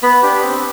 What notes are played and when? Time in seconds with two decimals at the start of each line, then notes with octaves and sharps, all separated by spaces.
0.03 B3 B5
0.22 D4 G4
0.43 C4